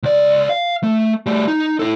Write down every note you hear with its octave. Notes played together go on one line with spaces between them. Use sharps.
C#2 D5
F5
A3
G3 A3
D#4
E4 A4